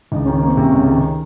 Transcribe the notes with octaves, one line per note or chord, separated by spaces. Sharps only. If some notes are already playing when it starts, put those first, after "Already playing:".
C#2 D#4
C#4
D#3
C#4
A#3 C4
C3 C#4
C#2
D#3